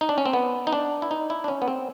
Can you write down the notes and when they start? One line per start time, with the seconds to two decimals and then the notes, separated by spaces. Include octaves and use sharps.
0.01 D#4
0.09 D4
0.18 C#4
0.25 C4
0.33 B3
0.67 D#4
0.73 D4
1.02 E4
1.11 D#4
1.30 E4
1.44 D4
1.48 C#4
1.62 B3
1.68 C4